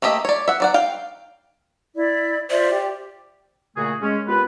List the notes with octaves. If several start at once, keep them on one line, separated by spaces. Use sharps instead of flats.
A3 A#3 G4 D#5 E5
C#5 D5
E5 F#5
F#3 D5 F#5
F5 G5
E4 D5
F4 C5 D5 E5
G4
A#2 C#3 A3 F#4 G#4
G#3 C#4
D#2 B3 F4 B4